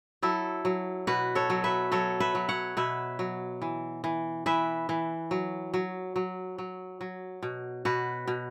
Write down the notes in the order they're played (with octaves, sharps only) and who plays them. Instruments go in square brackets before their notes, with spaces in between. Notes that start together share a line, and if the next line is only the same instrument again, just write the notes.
[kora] F#3 E4 A4
F#3
B2 F#4 B4
A4 C#5
F#3
B4 E5
F#3 A4 C#5
B4 E5
F#3
C#5 F#5
B2 B4 E5
F#3
E3
E3
E3 B4 E5
E3
F#3
F#3
F#3
F#3
F#3
B2
B2 F#4 B4
B2